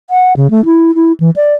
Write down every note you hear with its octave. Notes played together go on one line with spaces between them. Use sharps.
F#5
C#3
A3
E4
E4
E3
D5